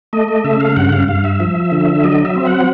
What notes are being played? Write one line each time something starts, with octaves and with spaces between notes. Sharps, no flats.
A3 D#5
D#5
C#3 E5
F5
G2 F#5
F5
G2 F5
E5
F3
D3
F#3 D#5
E5
C4
F#5